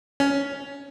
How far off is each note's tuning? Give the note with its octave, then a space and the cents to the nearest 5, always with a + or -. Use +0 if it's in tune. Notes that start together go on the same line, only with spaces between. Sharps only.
C#4 +15